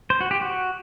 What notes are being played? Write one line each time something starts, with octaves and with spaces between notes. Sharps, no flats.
C5
F#4
G4
F#4